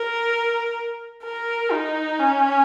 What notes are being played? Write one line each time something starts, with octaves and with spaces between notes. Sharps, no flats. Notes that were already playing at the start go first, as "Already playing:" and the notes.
Already playing: A#4
A#4
D#4
C#4